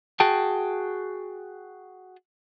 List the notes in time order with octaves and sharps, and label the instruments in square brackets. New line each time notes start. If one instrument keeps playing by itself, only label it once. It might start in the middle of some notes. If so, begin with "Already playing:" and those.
[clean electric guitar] F#4 G#4 G5 A5